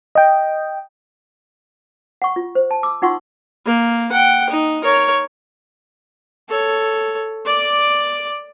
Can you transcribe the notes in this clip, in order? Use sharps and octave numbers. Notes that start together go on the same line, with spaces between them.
D#5 G5
F#5 C#6
F4
C5
A5
D6 E6
D#4 F4 F#5 C6 C#6 E6
A#3
F#5 G5
D#4
A#4 C#5
A4 C#5
D5 D6